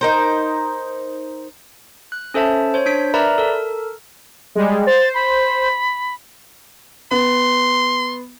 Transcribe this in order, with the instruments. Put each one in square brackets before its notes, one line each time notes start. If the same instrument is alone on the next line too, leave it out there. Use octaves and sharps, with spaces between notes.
[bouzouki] D#4 A#4 C5
[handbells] F#6
C#4 A4 C5 E5 A5
C5 C#5
D4 G6 B6 D7
A#4 B4 D5 E5 A#5 B5
A4 A#4
[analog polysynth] G3 G#3
[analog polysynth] C5 [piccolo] A6
[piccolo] B5
[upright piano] B3 [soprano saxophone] C6